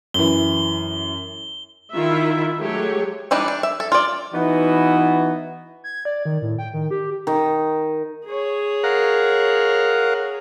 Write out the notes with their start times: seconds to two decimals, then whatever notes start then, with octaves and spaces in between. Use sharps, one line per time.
0.14 F#2 E3 G7
1.94 D#3 E4 F4 E5
2.59 F#3 G#3 A3 G4 C#5
3.31 E3 G3 D4 D#4
3.48 D4
3.63 E5
3.80 A4
3.92 F4 D5
4.33 E3 B3 D#4 F#4
5.84 G#6
6.05 D5
6.25 D#3
6.42 A2
6.58 G5
6.74 D#3
6.91 G4
7.27 D#3
8.26 G#4 C#5
8.84 A#4 F5 F#5